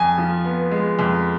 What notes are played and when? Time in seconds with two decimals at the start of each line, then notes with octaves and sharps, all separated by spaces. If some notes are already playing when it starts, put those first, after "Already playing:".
Already playing: F2 G#5
0.18 F3
0.45 B3
0.71 G#3
0.99 F2